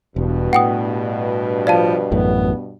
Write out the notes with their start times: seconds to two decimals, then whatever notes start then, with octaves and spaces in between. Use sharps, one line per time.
0.16 E1 G2 B2
0.53 A2 F#5 G5 D#6
1.67 F3 D5 F5 A5
2.11 A1 F#2 A2 B3